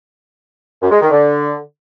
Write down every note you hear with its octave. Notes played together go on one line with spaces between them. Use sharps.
F#2
G#3
D#3
D3